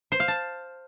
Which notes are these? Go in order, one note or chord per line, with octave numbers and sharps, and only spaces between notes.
C5
F5
A5